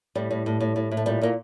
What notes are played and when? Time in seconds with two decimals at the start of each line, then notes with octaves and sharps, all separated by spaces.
0.15 A2 G3
0.31 A2
0.46 A2
0.60 A2
0.76 A2
0.91 A2
0.97 A3
1.06 A#2 G3
1.21 A#2 A#3